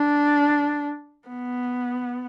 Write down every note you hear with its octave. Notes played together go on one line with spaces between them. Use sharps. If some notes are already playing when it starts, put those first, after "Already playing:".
Already playing: D4
B3